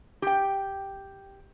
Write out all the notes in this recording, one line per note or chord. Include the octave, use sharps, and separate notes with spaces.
G4 G5